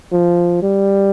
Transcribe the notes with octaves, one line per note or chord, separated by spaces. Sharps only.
F3
G3